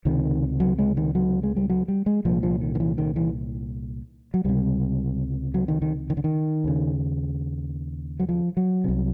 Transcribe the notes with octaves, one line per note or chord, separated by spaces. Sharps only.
C#2 C3 D#3
F#3
G#3
D#3
F#3
G#3
G3
F#3
G3
G#3
C2 A#2 F3
F3
D#3
D#3
E3
D#3
E3
F#3
C#2 C3 G3
F#3
D#3
D#3
D#3
D3
D#3
D#2 C#3
F#3
F3
F#3
C2 C3